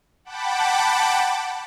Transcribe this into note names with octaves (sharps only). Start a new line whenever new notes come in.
F#5 G5 A5 B5 D6